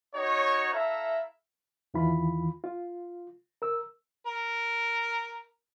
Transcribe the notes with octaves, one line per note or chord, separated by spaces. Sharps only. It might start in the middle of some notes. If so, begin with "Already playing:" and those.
D#4 F#4 C#5
E4 A4 E5 F5 A#5
E2 D#3 E3 F4 B5
F4
A#4 E6
A#4